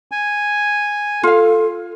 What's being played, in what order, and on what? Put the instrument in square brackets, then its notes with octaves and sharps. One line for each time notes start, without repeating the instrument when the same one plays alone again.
[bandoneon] G#5
[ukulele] F4 F5 [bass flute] A4